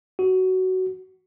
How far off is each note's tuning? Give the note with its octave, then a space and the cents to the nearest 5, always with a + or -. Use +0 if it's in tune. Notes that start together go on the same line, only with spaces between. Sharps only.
F#4 +15